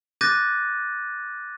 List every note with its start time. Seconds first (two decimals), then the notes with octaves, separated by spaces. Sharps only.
0.21 D6 F#6 G6 A6 A#6 D#7